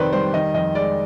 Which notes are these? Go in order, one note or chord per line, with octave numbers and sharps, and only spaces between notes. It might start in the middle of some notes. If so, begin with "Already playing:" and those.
Already playing: F2 C3 D#3 B4 C5 D5
G3 C5
D#3 D#5
F2 D#5
G#3 D5